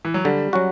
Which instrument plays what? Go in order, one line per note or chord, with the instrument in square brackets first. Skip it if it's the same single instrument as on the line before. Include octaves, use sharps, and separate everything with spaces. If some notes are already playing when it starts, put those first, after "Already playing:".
[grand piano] E3
F#3
[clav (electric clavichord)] D3 [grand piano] G3
[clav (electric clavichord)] F#3 C#4 F#4